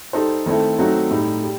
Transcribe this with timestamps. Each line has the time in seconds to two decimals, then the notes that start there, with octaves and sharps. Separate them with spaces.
0.13 G3 D#4 A4 C5
0.46 D#3 A3 C4 E4 A4
0.79 F#3 A3 C4 D#4 F#4
1.11 A2 G3 D#4
1.44 G3